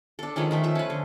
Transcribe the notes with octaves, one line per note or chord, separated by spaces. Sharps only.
D4 A4
D#3 F3 G#3 C#4
D#3 A3 E5
F3 E5
C#4 B4
D3